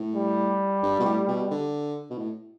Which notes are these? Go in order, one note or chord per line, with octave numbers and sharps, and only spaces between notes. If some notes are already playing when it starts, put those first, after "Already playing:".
Already playing: A2
G3
G2
B2
A2
B2
D3
B2
A2